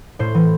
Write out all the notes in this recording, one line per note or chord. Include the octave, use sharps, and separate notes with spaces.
A2 C5
E3